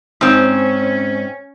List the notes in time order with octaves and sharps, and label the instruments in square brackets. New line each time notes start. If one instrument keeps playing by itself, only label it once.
[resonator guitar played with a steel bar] G#2 C4 [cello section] C#4